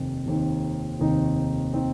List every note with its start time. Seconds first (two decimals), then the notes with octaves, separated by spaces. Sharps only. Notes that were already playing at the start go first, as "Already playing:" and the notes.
Already playing: F1 D#2 D#3 C4 D#4
0.26 F1 D#2 D#3 C4 D#4
0.99 F1 D#2 D#3 C4 D#4
1.73 D#3 C4 D#4